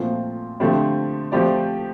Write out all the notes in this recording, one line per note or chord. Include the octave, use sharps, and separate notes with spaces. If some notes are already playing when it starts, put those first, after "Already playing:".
Already playing: A#2 F3 A3 C4 F4
D3 F3 A3 C4 G4
F3 A3 C4 G4 D5